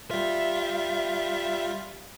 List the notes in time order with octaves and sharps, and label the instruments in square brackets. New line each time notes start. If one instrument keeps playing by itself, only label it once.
[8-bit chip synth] G3 F4 [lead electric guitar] E5